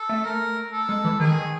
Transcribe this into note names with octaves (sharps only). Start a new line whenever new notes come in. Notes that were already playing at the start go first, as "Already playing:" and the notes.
Already playing: A4
A3
A#4
A4
G#3
E3
D#3 G#4